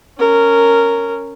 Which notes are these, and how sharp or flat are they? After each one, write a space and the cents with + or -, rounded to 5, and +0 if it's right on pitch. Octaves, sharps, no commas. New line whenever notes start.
C#4 +0 A#4 -10